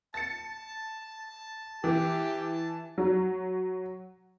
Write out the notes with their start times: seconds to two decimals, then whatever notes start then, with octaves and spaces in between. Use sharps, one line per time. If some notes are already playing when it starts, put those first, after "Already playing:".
0.14 A5 A6 C#7
1.84 E3 G4
2.98 F#3